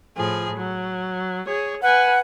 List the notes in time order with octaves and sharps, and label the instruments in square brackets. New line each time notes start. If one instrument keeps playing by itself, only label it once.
[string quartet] A2 F3 G#4
F#3
G#4 C#5
[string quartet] B4 G#5 [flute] F#5